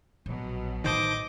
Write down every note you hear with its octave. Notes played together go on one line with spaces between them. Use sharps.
A#1 B2 F#3
A1 D#3 C5 D#5 A5 D6